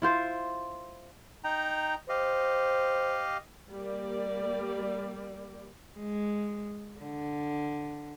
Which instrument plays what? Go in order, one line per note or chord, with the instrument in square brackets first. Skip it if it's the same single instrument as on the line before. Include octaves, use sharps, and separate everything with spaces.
[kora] E4 F4 C5
[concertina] D#4 G5 A#5
[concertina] G4 D#5 F5 [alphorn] C5
[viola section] G3 A#3 D5
[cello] G#3
D3